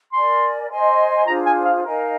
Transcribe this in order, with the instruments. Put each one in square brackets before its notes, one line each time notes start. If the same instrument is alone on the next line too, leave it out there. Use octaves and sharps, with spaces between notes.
[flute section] A#4 D5 G#5 [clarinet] C6
[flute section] C5 D#5 G#5 C6
[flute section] D4 F4 G#4 C5 [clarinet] A#5
[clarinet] G#5
F5
[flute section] D#4 A#4 F5 G#5